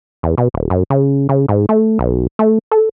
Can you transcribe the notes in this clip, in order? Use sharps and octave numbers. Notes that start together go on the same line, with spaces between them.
E2
B2
D#1
F#2
C#3
C#3
G#2
A3
B1
A3
A4